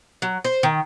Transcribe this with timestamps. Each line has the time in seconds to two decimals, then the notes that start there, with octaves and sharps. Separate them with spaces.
0.22 F#3
0.45 C5
0.63 D#3